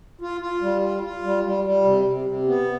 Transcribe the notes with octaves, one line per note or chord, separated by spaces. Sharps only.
F4
F4
G3
F4
F4
G3
G3
G3
C3
C3
C3
B3